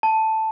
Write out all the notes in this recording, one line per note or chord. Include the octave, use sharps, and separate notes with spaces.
A5